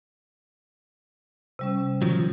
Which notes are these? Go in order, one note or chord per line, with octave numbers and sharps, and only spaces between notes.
C3 G3 C#4
D#3 F3 F#3